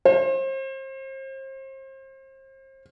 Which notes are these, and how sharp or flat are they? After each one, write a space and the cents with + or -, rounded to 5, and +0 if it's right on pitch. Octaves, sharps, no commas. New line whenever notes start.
C5 +35